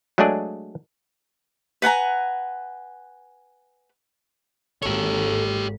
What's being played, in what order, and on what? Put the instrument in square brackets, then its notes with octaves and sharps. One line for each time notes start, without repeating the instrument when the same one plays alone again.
[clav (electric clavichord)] F#3 G#3 A3 D4 G#4 D5
[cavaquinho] B4 F#5 G#5 A#5
[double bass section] G#1 [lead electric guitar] G4 C#5 [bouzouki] A4